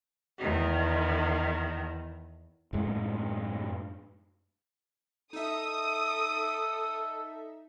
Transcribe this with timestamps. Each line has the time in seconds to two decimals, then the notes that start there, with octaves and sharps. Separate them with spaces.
0.39 E2 D#3
2.73 F#2 A2 G#3
5.33 D#4 A4 E5 D#6